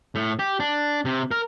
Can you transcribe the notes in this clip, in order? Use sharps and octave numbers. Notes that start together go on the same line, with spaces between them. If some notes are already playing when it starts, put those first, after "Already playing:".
A2
G4
D4
C3
A#4